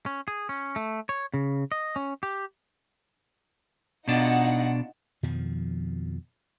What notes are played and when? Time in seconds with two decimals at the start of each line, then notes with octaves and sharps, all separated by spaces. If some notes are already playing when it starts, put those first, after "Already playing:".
0.06 C#4
0.28 G#4
0.49 C#4
0.76 A3
1.09 C#5
1.34 C#3
1.72 D#5
1.96 C#4
2.23 G4
4.08 B2 D4 D#4 F4 F#5
5.23 F2 B2 D#3 F3